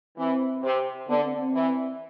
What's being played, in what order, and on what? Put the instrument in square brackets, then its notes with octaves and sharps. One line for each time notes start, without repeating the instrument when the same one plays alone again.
[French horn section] E3 [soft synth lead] C4
[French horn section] C3
[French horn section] D3 [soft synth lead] B3
[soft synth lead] C4
C4
[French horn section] E3